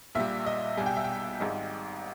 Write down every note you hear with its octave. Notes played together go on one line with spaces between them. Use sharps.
A#1 A#2 G3 E5
D#5
B1 B2 G3 G#5
G5
E5
G5
G#1 G#2 G3 D#5